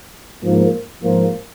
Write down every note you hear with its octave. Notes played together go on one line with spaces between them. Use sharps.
G#2 F3 A#3
G#2 F3 A#3 F4 A#4